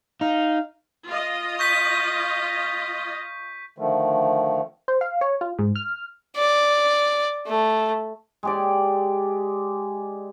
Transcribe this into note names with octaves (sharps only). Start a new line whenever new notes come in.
D#4 F5
F4 D#5
C#6 G6 B6
D3 D#3 F3 A3
C5
F5
C#5
F4
G#2
F6
D5
A3
G#3 G4 D5